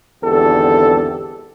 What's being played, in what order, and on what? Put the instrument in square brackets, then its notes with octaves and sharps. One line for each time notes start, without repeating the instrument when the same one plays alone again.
[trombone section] G#1 E2 D3 G4 A4